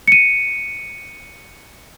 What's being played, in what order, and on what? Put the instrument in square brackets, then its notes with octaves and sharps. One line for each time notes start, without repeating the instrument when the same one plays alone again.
[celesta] C#7 D#7